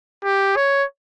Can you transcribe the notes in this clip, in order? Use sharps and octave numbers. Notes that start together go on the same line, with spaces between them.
G4
C#5